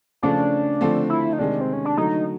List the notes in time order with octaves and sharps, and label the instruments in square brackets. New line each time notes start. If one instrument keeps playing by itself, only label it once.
[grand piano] C#3 F3 A3 C#4 F4 [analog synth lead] D4
[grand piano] D3 F3 A3 C4
[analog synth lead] E4
D#4
[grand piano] C3 D#3 G#3 [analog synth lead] D4
[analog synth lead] C4
C#4
D4
[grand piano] D3 F#3 A3 [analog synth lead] D#4